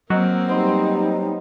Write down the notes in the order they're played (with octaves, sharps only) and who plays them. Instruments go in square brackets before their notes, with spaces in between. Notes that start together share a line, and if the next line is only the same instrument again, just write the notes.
[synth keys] F#3 [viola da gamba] A#3 C4 [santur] A#4 D#5 E6
[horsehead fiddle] G3 D#4 [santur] B3 C5 D#6